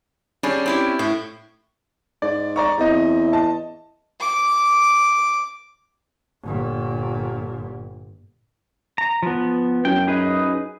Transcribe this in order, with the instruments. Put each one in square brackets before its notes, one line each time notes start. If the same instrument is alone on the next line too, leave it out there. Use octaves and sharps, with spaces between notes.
[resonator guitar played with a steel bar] G3 G#4 [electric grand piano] C#4 D4
[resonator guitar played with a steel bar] C4 E4 G4
[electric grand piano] A2 [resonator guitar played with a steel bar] E5
[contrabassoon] G#2 [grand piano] D5
[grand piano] D5 A#5 C#6
[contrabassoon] E2 [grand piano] C4 D#5
[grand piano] D#5 A5
[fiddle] D6
[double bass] G1 A#2
[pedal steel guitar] A#5
F3 B3
[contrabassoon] F#2 [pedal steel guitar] G5
[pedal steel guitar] D#4 G#4 B4